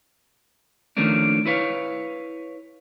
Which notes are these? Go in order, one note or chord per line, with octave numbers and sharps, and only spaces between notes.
D#3 F3 A3 A#3 C#4 D4
E4 B4 C#5 F5